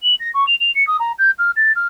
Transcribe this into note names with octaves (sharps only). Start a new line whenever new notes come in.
F#7
A#6
C#6
F7
F7
C#7
D#6
A#5
G6
F6
A6
F6